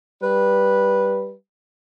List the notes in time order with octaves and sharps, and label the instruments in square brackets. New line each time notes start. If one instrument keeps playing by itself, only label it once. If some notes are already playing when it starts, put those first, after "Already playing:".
[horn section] G3 B4